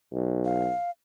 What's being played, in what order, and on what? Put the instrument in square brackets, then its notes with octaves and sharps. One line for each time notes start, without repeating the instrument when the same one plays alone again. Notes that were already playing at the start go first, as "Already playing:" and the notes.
[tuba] B1
[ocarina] F5